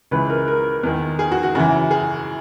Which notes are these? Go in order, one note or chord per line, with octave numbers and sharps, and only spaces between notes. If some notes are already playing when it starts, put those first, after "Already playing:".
C#2 C#3 E3 B4
A#4
A#4
E2 D#3
G#4
F#4
F#4
F#2 C#3 E3 F#4
G#4